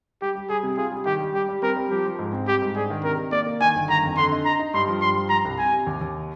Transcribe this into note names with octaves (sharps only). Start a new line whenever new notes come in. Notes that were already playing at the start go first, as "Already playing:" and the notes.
G3 G4
G3
G3 G#4
C3
F4 G#4
G3
D#3 G4
G3
G3 G4
G3
C4 A#4
G3
F3 G4
F3
G#2
C4
G3 G4
G#2
D4 G#4
D#3
C3 A#4
D#3
A#3 D5
A#3
D#3 G#5
G1
D#3 A#5
F2
D3 C6
D#4
D#4 A#5
D#4
G2 C6
F3
G2 C6
F3
F3 A#5
C2
C3 G#5
C3
D#2
D#2